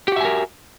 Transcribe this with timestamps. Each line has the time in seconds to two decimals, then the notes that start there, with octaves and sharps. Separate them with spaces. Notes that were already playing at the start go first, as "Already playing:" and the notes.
0.08 G4
0.12 F#4
0.16 E5
0.21 G#5
0.25 A#4